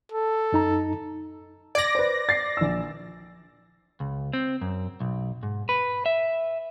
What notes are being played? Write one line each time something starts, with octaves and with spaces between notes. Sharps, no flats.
A4
F#2 D#4 A#5
D5 G#6 A#6 D7
B4 C5
A6 C7
A#1 E6
C#2
C4
F#2
B1
G#2
B4
E5